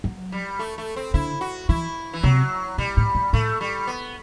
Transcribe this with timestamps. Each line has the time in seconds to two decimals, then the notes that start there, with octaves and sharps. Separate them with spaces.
0.04 F#3
0.32 G3
0.59 A3
0.78 A3
0.96 C4
1.14 D3 E4
1.41 F#4
1.69 E3 E4
2.13 E3
2.23 C3 F#3
2.78 B2 G3
2.97 A2
3.15 A2
3.33 A2 A3
3.61 G3
3.87 B3